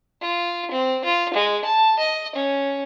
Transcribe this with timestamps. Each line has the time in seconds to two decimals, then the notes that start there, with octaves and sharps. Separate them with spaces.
0.21 F4
0.71 C4
1.05 F4
1.34 G#3
1.65 A5
1.99 D#5
2.36 C#4